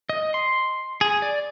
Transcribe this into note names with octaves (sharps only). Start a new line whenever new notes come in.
D#5
C6
G#4
D5